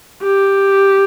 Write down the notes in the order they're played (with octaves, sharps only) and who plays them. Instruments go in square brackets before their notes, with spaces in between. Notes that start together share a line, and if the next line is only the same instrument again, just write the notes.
[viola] G4